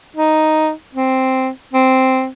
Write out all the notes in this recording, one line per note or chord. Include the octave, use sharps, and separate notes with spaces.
D#4
C4
C4